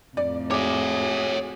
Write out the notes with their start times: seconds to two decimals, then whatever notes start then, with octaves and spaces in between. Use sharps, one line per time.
0.17 F2 A2 D5
0.51 F#4 G#4 C#5 E5 D6